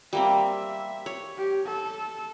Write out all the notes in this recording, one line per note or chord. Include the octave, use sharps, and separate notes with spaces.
G3 A#3 C4 E5
C#5
G4
A4